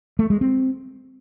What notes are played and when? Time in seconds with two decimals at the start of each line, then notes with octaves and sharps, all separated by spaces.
0.19 A3
0.30 G#3
0.41 C4